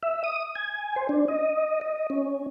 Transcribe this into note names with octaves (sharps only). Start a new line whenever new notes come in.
E5
D#6
G#5
C5
D4
D#5
D#5
C#4